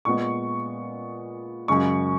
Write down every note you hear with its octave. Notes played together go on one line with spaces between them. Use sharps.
A#2 G#3 B3 C#6
F#2 C#3 G#3 C#6